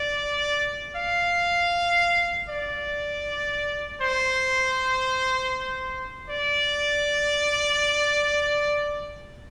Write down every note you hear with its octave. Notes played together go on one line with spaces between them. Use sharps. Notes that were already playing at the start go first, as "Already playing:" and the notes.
Already playing: D5
F5
D5
C5
D5